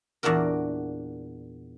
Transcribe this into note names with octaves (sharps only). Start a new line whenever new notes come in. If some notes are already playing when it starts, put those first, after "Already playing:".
E2 A#2 D4 F#4 A#4